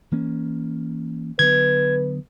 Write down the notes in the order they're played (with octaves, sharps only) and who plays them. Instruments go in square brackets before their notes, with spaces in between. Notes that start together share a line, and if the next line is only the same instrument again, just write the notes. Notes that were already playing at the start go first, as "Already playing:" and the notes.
[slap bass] E3 A#3 C#4
[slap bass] D3 F#3 B3 [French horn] B4 [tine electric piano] G#6